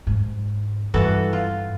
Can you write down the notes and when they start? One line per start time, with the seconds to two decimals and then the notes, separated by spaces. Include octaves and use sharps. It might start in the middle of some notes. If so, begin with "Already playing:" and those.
0.07 G#2
0.94 G2 E3 F#4 A4
1.33 F4